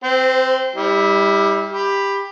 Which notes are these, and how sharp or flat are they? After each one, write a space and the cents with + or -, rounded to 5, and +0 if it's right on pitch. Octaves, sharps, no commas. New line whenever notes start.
C4 +0 C5 -25
G3 +20 E4 -25
G4 +15 B5 +0